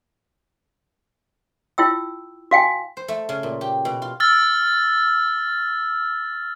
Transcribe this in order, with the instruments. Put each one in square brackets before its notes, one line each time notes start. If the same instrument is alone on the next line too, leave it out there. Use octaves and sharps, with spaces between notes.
[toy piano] E4 F4 G5 E6
F#4 F5 G5 G#5
[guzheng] C5
A3
C#3
A#2
G4
B2
F4
[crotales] E6 F6 A6